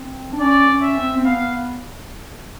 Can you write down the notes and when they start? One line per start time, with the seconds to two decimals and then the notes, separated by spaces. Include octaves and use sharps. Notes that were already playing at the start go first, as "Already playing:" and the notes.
Already playing: C4
0.32 D4
0.40 C#4 D5
0.69 C#4
0.82 E5
0.97 C4
1.16 C4
1.25 B3 F5